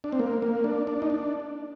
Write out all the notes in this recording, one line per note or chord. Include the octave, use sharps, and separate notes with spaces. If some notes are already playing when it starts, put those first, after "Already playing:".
D4
C4
A#3
A#3
D4
D4
D#4
D4